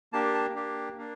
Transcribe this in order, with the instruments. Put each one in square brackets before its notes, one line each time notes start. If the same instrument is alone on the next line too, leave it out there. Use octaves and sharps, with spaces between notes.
[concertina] A#3 D4 G4 A5
A5
A#3 D4 G4
A#3 D4